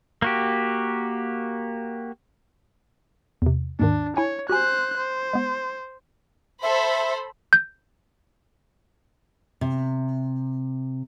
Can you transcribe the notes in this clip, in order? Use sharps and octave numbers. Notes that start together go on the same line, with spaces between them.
A#3 F#4 G4
E2 C3
D#2 G#2 D#3 D4
E4 C#5 G#5
F#4 G4 C5 G#5 F#6
C5
G#3 B3
A4 C5 E5 B5
G6
C3